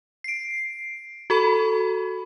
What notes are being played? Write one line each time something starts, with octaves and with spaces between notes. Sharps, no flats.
C7 D7
F#4 A4 B5